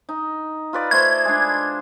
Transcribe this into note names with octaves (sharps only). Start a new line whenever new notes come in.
D#4
F4 B4 D5
A3 C5 G#6
G#3 D4